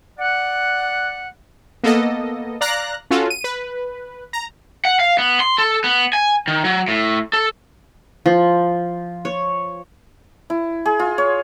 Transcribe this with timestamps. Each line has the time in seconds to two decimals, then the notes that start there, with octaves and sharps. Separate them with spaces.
0.18 D5 F#5
1.84 A#3 B3 A4 D#5
2.61 D5 F5 A#5 F#6 A#6
3.11 C#4 F4 F#4 A4
3.30 D#7
3.44 B4
4.33 A#5
4.85 F#5
5.00 F5
5.18 B3
5.40 C6
5.58 A4
5.84 B3
6.13 G#5
6.48 D#3
6.65 F#3
6.88 A2
7.33 A4
8.26 F3
9.25 C#5
10.50 E4
10.86 G#4
10.99 F4
11.18 C#5